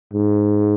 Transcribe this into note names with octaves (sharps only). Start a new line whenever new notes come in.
G#2